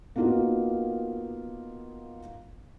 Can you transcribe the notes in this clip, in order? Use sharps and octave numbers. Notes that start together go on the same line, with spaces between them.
A#3 B3 D#4 F4 F#4 A#4